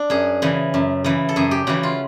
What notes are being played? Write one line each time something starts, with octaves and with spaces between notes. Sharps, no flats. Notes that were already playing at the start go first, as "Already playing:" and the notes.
Already playing: D4
F#2 G#4
C#3 E3
F#2
C#3 E3
A4
F#2 G#4
G4
C#3 E3 F#4
F4